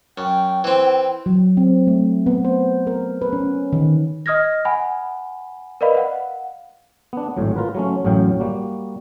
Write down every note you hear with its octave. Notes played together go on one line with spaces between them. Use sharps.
F#2 G5
E3 C4
F#3
C4
A3
B3
C5
A#4
B4
C#4
D#3
D#5 D#6 F6 G#6 A#6
F#5 G#5 B5
A#4 B4 D5 D#5 F5 B5
F5 F#5
B3 D4
G#1 A2 F#3
F4 A#4 B4
F#3 A3 C#4
A1 F#2 A2 F#3 F5 G5
G3 A#3 F#4